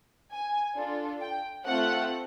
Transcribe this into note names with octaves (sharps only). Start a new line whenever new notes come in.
G#5
D4 F4 A4
G5
A3 C4 F4 A4 F#5